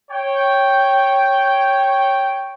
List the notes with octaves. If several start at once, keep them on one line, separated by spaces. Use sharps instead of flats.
C#5 G5